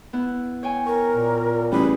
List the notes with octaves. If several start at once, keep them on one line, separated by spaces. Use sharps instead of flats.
B3 E4
C#5 G5 G#5
A#4 C#6
A#2
A1 G3 G#4 B5